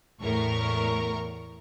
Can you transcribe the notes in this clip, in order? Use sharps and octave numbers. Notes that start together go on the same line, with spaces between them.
E2 A2 A#4 C#6